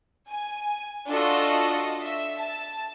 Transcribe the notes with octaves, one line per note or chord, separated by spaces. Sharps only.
G#5
D4 F4 F#4 A4 D#5
E5
A5